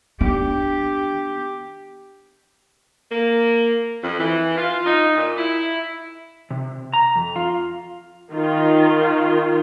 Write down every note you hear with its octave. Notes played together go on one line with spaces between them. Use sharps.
B3 D4 G4
A#3
F2
E3
F4
D#4
A#2
E4
C3
A#5
F2
F4
D#3 F4